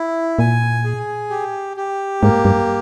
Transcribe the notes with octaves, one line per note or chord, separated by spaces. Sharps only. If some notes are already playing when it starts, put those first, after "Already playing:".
Already playing: E4
A#2 G#5
G#4
G4
G4
G#2 A#3
G2